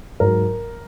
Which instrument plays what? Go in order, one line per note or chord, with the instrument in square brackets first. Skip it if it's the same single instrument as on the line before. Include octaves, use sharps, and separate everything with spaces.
[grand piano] G#2 F#3 A#4